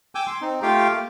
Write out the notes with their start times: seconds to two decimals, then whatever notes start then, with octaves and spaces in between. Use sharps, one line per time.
0.15 G5 G#5 D6 E6 G6
0.27 C6
0.41 C4 D#4
0.62 A3 F4 G4 F5 G5
0.93 A#3